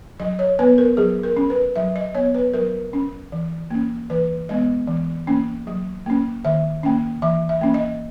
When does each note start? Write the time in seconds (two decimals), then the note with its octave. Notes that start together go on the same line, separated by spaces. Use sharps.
0.20 F#3 D#5
0.39 C#5
0.59 B3 B4
0.78 A#4
0.97 F#3 G#4
1.23 A#4
1.37 C#4
1.50 B4
1.76 F#3 E5
1.96 D#5
2.15 B3 C#5
2.34 B4
2.54 F#3 A#4
2.93 C#4
3.32 E3
3.71 A#3 C#4
4.10 E3 B4
4.49 G#3 B3 D#5
4.88 E3
5.27 A#3 C#4
5.67 F#3
6.06 A#3 C#4
6.45 D#3 E5
6.83 A#3 C#4
7.22 E3 E5
7.49 E5
7.61 A#3 C#4
7.74 D#5